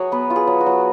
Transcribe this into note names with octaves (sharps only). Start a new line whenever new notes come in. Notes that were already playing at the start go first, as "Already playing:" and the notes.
Already playing: F#3 F#4 G#4 C#5
B3 B4
F4
G#4
F#3
F#4
F#3